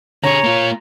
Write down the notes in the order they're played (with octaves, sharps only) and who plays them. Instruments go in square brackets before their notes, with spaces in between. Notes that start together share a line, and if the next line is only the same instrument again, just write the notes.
[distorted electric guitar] D3 G#4 [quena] C#5 [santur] A#5
[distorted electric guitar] A#3 F4